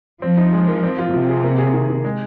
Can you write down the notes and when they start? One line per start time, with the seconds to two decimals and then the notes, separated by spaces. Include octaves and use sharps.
0.22 F3 C4
0.37 D#4
0.53 G#3
0.68 A#4
0.83 C4
0.99 F4
1.13 C3 F3
1.29 G#4
1.44 A#3
1.58 G#4
1.74 D#3
1.90 D#3
2.04 G#3